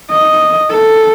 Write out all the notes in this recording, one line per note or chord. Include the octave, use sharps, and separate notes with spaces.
D#5
A4